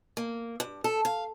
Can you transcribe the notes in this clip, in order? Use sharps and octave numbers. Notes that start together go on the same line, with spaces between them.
A#3
G2
A4
F5